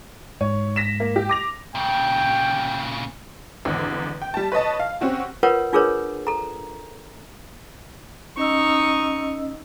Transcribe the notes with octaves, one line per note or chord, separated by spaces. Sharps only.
G#2 C#5
A#6 B6 E7
A#3
G4
D6 A#6 F7
A#2 C#3 G5
G#1 E2 D3
G5
G3 A5
B4 C#5 D#5 A5
F5
C4 C#4 F#4 G4
F4 A#4 B4 C#5 F#5
D4 F4 G#4 A#4 B4 C#5
A4 A#5
C#4 D#4 D#5 C#6 E6